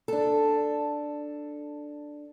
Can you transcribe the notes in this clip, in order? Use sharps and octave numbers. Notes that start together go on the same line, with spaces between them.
D4 A4